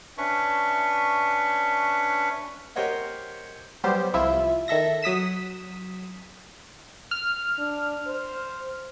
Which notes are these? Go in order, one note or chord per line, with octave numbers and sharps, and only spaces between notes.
C#4 D4 B4 E5 C#6
G4 A#4 C5 C#5 D#5 F#5
F#3 G3 B3 G4 C5
C2 F3 E4 F4 E5
D#3 A4 E5 A#6
F#3 D#6 B6 E7
F6
D4
C5